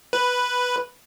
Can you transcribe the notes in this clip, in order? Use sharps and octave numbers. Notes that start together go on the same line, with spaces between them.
B4